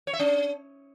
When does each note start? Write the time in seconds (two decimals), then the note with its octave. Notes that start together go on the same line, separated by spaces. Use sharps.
0.07 C#5
0.13 E5
0.20 C#4